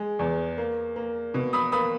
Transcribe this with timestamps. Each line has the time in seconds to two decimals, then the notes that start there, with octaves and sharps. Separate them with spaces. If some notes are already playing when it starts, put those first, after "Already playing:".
Already playing: G#3
0.19 E2
0.58 A#3
0.96 A#3
1.34 B2
1.53 B5 D#6
1.72 A#3 B5 D#6